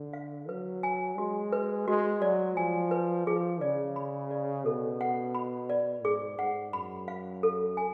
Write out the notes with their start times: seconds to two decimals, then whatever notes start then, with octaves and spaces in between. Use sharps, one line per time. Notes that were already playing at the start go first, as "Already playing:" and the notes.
Already playing: D3
0.13 F5
0.49 F#3 B4
0.83 G#5
1.18 G#3 F#4
1.53 B4
1.88 G#3 F#4
2.22 F#3 D5
2.56 F3 G#5
2.91 B4
3.27 F3 G#4
3.61 C#3 D5
3.96 B5
4.31 D5
4.65 B2 A4
5.01 F#5
5.35 B5
5.70 D5
6.04 G#2 G#4
6.39 G#2 F#5
6.73 F#2 B5
7.08 F5
7.43 A4
7.77 G#5